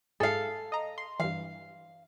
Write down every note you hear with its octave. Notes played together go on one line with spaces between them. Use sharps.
G#2 G#4 A4 F5
D#5 A#5
C6
G2 E3 F5